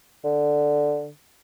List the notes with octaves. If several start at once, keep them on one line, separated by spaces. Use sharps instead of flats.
D3